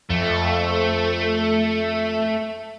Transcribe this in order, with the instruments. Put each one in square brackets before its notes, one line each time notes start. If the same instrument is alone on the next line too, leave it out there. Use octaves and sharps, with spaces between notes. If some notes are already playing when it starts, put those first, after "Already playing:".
[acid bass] F2 [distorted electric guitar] A3